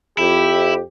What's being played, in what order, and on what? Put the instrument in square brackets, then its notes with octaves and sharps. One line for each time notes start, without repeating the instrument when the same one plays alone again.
[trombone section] F2 [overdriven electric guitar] E4 [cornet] G4